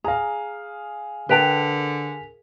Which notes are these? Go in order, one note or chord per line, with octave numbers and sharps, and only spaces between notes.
G#4 F5 A#5
D3 A#4 B4 G5 A5 B6 F7